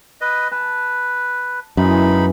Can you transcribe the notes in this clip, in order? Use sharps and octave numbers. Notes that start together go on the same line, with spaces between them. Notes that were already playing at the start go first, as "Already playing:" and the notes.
B4 D#5
B4 A5
F#2 E3 G#3 D4 D#4 B5